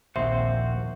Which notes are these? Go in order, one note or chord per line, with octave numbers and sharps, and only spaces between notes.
A#1 D#2 C4 F#4 C5 E5 F#5 C6